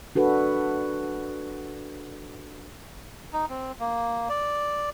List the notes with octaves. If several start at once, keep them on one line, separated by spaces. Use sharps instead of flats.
D4 F#4 A4 B4
D#4
C4
A#3
D5